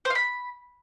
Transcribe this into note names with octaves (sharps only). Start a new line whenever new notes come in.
C5
F5
B5